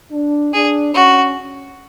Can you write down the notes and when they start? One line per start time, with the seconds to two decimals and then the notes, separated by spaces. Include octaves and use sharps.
0.11 D4
0.54 D4 G#4
0.94 C#4 F#4